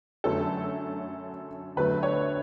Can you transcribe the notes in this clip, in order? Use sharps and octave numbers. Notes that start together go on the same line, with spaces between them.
F#2 D3 F#3 A3 A4
D2 D3 F#3 A3 B4
C#5